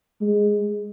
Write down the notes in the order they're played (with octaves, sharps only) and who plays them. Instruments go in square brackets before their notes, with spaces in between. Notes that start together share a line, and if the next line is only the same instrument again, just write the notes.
[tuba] G#3